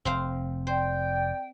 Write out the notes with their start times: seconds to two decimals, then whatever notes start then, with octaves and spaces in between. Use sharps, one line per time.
0.05 F1 C4 C5 F5
0.67 C5 D5 G5